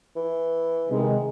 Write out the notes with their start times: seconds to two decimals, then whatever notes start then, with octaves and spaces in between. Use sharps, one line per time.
0.16 E3
0.90 C3 D#3 G#3